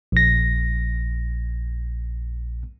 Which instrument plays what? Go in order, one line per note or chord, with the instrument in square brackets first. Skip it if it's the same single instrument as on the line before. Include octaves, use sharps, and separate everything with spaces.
[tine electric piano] A#1 A#6